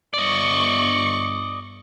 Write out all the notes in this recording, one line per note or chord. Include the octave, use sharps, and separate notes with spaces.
G1 D5 D#5 C#6